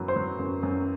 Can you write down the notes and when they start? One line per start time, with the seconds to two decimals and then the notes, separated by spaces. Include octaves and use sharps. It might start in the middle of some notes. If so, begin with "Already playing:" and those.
Already playing: F#2 F#3 B3 B4
0.08 C5
0.16 F#3
0.39 F#2
0.63 F#2